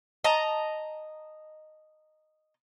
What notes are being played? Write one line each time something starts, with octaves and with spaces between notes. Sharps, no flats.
D#5 A5 A#5